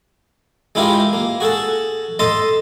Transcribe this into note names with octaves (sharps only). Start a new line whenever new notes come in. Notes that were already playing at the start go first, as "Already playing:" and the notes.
G#3 E4 F4 G4 G#4 A#4
A#3
F#4 G#4 A4 A5
A4 D#5 A5 A#5 C6